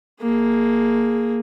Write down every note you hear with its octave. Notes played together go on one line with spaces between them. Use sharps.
A#3 G#4